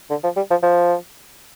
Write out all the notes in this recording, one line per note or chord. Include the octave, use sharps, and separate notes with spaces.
D3
F3
G3
F3
F3